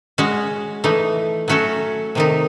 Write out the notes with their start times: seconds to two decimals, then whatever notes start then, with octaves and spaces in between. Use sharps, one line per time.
0.18 G#3 C#4 F#4
0.84 E3 A3 D#4
1.48 F#3 A3 C#4 F#4 A4
2.15 C3 D#3 A3 D#4